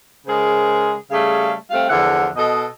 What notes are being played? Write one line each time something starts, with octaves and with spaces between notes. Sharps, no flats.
C#3 G#3 G#4 A#4 C5
C#3 G3 A3 G#4 F5
G3 A3 C4 F5
E2 D3 F3 E5 F#5
B2 A4 D#5